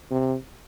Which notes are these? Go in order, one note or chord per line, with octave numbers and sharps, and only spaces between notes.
C3